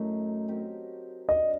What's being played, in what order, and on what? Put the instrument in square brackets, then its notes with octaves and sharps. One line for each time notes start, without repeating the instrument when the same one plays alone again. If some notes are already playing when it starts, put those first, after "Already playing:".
Already playing: [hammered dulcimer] F#2 A2 F#3 A3 D#4
F#3 C4 G4 A#4
[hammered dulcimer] G3 D4 G4 A#4 [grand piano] D#5